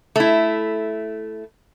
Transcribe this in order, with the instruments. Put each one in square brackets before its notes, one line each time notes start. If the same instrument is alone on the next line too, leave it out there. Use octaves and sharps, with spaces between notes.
[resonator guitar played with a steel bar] A3 E4